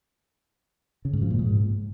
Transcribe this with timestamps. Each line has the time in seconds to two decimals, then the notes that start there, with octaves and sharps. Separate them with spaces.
1.05 C#3
1.13 G#2
1.22 F3
1.30 A#2
1.39 G#2